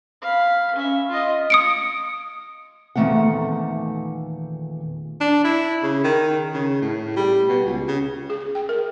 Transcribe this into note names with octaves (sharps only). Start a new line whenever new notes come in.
F5 B5
C#4 E5
F4 D#5
D#6 C#7 D7
E2 A#2 D#3 A3 C4 F#5
D4
E4
C#3
D#3
C#3
A2
G3
B2
C#2
C#3
G#4
G5
A#4